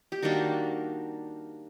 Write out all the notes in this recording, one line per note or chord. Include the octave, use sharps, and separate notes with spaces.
G4
D#3 G3 A#3 D4 F#4